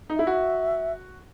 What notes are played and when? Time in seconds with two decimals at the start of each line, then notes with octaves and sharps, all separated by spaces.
0.10 D#4
0.15 E4 E5
0.27 F#4